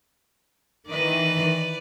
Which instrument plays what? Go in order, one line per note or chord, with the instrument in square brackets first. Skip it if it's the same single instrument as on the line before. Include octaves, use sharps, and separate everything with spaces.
[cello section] D#3 E3 D#5 [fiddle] B4 D5